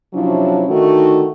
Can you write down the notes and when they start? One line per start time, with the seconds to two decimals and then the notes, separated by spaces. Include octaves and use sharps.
0.13 C3 F3 F#3 C#4 D4 E4
0.68 D3 D#3 A3 D#4 F#4